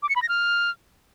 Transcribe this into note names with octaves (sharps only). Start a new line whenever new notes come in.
D6
C#7
B5
A#6
F6